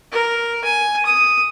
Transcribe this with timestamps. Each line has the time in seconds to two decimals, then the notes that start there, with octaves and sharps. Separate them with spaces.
0.12 A#4
0.64 G#5
1.05 D#6